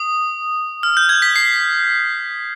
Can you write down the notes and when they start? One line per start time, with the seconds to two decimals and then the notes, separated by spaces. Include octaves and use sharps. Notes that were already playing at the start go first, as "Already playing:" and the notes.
Already playing: D#6
0.83 F6
0.97 G6
1.09 G#6
1.22 B6
1.36 C7